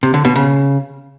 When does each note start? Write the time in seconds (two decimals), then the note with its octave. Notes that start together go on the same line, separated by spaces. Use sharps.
0.03 C3
0.14 D3
0.25 B2
0.36 C#3